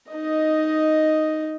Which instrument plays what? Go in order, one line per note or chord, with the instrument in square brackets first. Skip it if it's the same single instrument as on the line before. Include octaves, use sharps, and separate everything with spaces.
[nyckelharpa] D#4 D#5